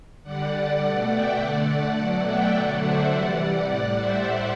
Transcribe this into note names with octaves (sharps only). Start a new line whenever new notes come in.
D3 G3 D5 F#5
B2 A3
E5 G5
D3 A3 D5 F#5
B2 F#3 A3 D5 F#5
E5 G5
D3 F#3 A3 D5 F#5
C5 E5
C3 E3 G3 D5 F#5
D5 F#5
A2 G3
C5 E5